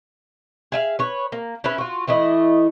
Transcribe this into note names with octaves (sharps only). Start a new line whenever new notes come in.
G#4 E5 F5
B4 C#5
A#3
C#4 E4 B4
F4 F#4
E3 A3 E4 D#5